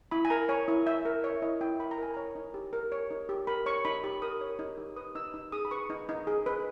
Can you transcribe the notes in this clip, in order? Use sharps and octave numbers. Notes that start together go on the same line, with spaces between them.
E4 B5
G#5
A#4 A#5
C#5 G#5
E4
E4 E5
A#4
C#5 E5
E4 D#5
E4 G5
A#4 B5
A#5
A#4 G#5
C#5 A#5
D#4
G4
A#4
C#5
D#4
G4
A#4 B5
C#5 C#6
D#4 B5
G4 B5
A#4 D#6
C#5
D#4
G4
B4 D#6
D#4 E6
D#4
G#4 D#6
B5
B4 C#6
D#4
D#4
G#4
B4